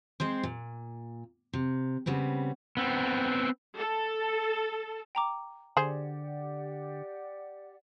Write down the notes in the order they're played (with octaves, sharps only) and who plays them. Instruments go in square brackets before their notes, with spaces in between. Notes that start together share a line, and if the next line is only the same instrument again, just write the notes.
[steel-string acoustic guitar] G#3 C4 C5
A#2
C3
C#3 G3 B3 C4
[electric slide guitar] B3 C4
[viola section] A4
[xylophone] G5 A#5 D6
[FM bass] D3 [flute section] G4 D5 F#5 [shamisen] G#4 C5